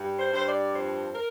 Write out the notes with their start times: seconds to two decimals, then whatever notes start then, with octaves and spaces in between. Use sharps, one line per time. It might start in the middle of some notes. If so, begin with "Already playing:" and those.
Already playing: G2
0.18 C5
0.32 G2 C5
0.46 D5
0.73 F2 C5
1.14 A#4